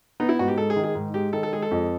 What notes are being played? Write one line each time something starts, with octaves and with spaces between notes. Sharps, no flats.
B3 D#4
E4
G#2 F#4
G4
G#3 A4
G#4
D#3
G#4
G#2
G#3 G4
D#3 A4
A4
G#3 G#4
A4
F2